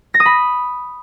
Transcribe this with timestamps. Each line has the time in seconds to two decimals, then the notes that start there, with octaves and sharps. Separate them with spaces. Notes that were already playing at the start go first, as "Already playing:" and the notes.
0.14 A#6
0.20 D#6
0.26 B5